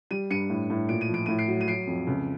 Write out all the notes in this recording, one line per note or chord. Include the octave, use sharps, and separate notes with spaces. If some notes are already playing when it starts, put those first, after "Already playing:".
G3 D#7
G2 C#7 D#7
A2
A2
A#2 D7
D#7
F3
D7
A2 D#7
C7 D7
F#3
D#7
F#3 C7 D7
F2
C#2